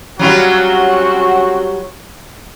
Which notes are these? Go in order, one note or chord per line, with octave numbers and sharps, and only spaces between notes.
F#3 G3 C4 C#4 F4 F#4